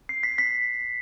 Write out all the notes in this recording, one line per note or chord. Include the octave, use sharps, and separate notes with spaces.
C7
B6
B6